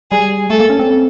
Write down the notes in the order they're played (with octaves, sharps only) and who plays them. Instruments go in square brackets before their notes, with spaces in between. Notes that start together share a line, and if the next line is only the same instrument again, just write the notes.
[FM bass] G3 [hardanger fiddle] G#4
[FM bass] A3 [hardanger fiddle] A4
[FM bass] A#3
C#4
C4